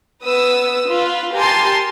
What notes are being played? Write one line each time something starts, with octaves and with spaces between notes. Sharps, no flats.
B3 B4 D#6 E6
F4 B4
G4 A#4 G#5 A5 C6